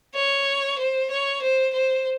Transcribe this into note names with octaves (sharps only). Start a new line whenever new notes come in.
C#5
C5
C#5
C5
C5